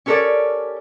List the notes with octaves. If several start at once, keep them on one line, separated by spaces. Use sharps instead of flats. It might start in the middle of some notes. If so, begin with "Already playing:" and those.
C#4 G4 A4 A#4 C#5 D5